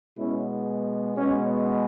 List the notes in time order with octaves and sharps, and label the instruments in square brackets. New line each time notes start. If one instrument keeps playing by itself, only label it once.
[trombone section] B2 G#3 B3 C#4 E4
B2 G#3 B3 C#4